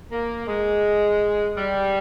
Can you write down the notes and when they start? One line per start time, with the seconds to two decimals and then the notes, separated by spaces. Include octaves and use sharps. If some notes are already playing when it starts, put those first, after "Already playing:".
0.11 A#3
0.48 G#3
1.57 G3